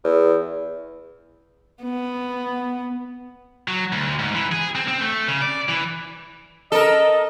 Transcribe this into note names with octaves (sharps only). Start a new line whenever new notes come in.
E2
B3
F#3
D2
G#2
E3
G#4
C4
C4
A3
C#3
D5
E3
A4 A#4 D#5